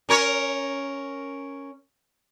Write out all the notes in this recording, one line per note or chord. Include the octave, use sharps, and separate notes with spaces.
C#4 A#4 C#5